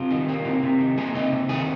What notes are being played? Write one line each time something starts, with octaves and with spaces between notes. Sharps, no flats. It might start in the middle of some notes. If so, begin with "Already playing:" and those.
Already playing: C3 F4
D#3
A#3
C3
C3
D#3
A#3 G#4
C3 D#4
C3
D#3 G#4